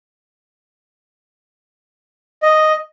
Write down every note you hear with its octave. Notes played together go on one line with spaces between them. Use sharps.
D#5